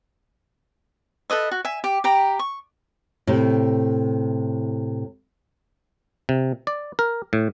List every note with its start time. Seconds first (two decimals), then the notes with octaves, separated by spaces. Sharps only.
1.30 A4 B4 D#5 E5
1.51 F#4
1.65 E5 G#5
1.84 G4
2.04 G4 G5 A#5 B5
2.39 C#6
3.27 A2 C3
6.29 C3
6.67 D5
6.99 A#4
7.33 A2